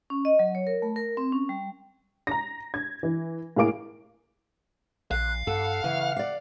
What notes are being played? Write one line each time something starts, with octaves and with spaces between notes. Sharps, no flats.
C#4
D#5
F#3
C#5
A#4
A3
A#4
C4
C#4
G3
A#5 A#6
G#6
E3
A2 A#3 G#4 F5 D6 D7
A#1 F5 F#6
G2 A4 F#5
C#3 E3
D5 F5